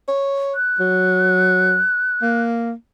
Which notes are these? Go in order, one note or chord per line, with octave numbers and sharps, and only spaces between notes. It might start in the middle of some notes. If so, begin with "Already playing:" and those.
C#5
F#6
F#3
A#3